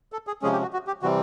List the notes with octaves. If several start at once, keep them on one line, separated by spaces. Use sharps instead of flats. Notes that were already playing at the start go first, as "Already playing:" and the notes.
A4
G#4
C3 F3 G#3 C#4 G#4
G4
F#4
F#4
G4
C3 E3 G3 C4 F#4